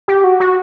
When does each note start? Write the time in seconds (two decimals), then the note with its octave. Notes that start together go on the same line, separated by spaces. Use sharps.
0.08 G4
0.24 F#4
0.40 F#4